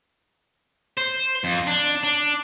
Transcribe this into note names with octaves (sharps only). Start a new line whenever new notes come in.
C5
F2
D4
D4